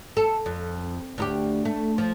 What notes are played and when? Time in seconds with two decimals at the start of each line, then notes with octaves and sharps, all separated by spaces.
0.17 A4
0.46 F2
1.18 D2 D#4 G4
1.65 A3
1.98 F3